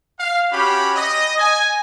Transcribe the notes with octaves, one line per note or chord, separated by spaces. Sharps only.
F5
C#4 F#4 G4 B5
D#5
G#5